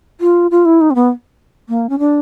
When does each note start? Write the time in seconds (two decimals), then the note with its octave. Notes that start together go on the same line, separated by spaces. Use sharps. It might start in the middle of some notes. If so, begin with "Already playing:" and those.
0.21 F4
0.51 F4
0.65 E4
0.81 D#4
0.90 C4
0.95 B3
1.69 A#3
1.89 C#4
1.99 D4